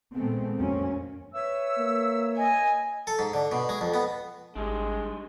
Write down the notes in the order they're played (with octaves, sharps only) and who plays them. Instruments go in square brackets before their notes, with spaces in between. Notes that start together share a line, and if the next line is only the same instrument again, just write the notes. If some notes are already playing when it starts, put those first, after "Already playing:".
[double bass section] A#2 D#3 G#3 A3 B3 C4
F2 F#3 A#3 C4 C#4
[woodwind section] B4 C#5 E5 [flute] E6
[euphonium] A#3
[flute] D#5 [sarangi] G#5
[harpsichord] A4
G#2
D3
B2
G#3
F2
B3
[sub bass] G#1 [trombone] G#3 [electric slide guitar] D4 G4 G#4